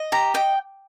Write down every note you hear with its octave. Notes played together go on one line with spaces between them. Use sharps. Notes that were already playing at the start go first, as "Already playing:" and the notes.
Already playing: D#5
G4 A#5
D#5 G5